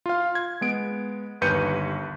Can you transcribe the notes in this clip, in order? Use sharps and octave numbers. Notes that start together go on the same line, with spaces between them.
F4 F5
G#6
G#3 B3 D7
G1 D#2 B4 G6 C#7 D#7